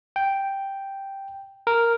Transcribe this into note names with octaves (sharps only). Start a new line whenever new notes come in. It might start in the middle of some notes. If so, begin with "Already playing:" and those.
G5
A#4